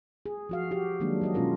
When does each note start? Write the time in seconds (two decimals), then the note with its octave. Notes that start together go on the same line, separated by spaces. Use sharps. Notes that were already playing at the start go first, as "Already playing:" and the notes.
0.26 G#4
0.49 F3 F#4 F5
0.71 F#4 G4
1.00 D#3 F#3 G#3 A#3 D4
1.21 F#3 F#4 D#5
1.34 B2 G#3 C#4 F4 A#4